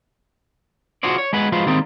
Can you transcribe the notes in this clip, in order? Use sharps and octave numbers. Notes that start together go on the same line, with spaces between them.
F4 F#4 G#4 C5 D5
C#5
G#3 G#4 B4 F#5
F3 G#3 F4 F#4 B4 C5
D#3 G3 G#3 A#3 C4 D#4